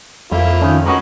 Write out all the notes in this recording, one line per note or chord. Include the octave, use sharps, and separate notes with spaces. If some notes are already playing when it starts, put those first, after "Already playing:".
F2 A#3 E4 F4
D#3 C#4
G#3 C#4 F#4 A#4 B4 D#5